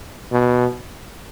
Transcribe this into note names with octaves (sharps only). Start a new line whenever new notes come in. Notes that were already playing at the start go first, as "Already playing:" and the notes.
B2